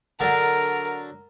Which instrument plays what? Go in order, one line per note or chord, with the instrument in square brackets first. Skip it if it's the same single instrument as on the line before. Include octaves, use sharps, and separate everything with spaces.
[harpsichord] D3 F#3 [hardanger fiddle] A#4